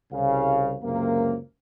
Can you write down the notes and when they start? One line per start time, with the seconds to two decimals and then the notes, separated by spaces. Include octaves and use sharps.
0.12 C2 C#3 F5
0.82 C#2 F#2 C3 A#3